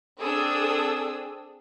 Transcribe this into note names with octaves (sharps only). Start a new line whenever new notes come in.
C4 D4 G#4 A4 D#6 E6